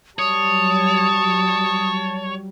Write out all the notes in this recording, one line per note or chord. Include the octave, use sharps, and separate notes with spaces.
F#3 G3 C#5 A5 D#6